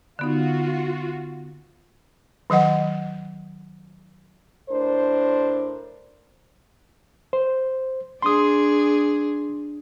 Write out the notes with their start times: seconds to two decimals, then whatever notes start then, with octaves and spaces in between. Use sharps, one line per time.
0.19 D3 B3 D#4 F4 F#4
2.50 D#3 F#3 D#5 F#5
4.70 A2 D4 A#4 C5
7.33 C5
8.22 D4 G#4 C6 D#6